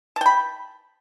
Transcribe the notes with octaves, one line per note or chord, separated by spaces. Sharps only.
G5 A5 B5